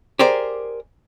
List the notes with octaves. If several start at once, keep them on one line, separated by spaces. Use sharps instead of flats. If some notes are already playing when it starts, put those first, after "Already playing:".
G4 G#4 A#4 C5 D5